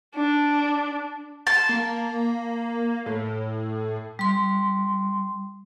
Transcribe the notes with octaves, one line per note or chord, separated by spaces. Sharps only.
D4
A5 C6
A#3
A2
G3 C6